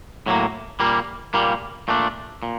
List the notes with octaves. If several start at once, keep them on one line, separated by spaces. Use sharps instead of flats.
A2 F#3 A#3
A#2 G3 A#3
A#2 G3 A#3
A#2 A3 D4
A#2